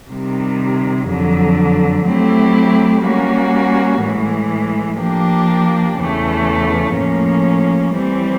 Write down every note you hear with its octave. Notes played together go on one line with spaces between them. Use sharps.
C3 D#3 G3
F2 D3 F#3
F#3 A3 C4 E4 G4
G3 A#3 C#4 F#4
A2 E3 G#3
F3 A#3 D4 G4
E2 C#3 E3 A3
A2 F3 A#3 C#4
E3 G3 C4